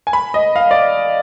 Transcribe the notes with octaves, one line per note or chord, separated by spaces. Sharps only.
G#5
B5
D#5
F5
D5